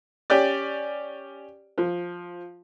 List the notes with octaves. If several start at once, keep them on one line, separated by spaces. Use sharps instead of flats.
C#4 G4 D5
F3